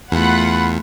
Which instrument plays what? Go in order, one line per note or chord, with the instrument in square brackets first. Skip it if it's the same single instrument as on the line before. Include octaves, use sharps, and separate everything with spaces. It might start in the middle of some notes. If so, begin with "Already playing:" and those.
[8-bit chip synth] E2 [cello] A3 F4 [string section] F#5 B5